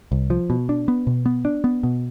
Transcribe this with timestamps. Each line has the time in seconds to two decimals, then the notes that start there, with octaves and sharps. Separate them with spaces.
0.12 C2
0.30 F3
0.50 B2
0.69 D4
0.88 B3
1.07 B2
1.26 B3
1.45 D4
1.64 B3
1.83 B2